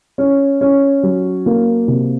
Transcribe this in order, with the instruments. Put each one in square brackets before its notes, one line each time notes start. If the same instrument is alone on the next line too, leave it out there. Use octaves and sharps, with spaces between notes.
[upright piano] C#4
C#4
F#3
A#3
C3